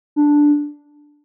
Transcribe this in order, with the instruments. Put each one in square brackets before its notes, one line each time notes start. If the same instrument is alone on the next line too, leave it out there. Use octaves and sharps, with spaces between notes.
[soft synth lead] D4